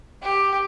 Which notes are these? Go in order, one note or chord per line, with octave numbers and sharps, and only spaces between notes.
G4